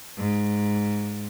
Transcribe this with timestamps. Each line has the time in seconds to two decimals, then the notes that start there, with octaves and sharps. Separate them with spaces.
0.18 G#2